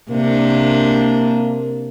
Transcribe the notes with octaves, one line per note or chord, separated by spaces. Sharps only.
C3 A#3 D4